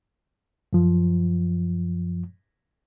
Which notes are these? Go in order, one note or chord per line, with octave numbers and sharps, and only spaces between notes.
F#2 F3